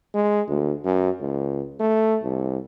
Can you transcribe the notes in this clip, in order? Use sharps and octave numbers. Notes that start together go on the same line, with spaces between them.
G#3
D2
F#2
C#2
A3
C2